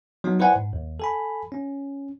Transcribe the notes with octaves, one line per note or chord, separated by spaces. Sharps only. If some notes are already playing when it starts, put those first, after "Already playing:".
F#3 B3 D#4
E4 B4 C5 D5 F#5 G#5
G#2
D#2
A4 G#5 B5
C#4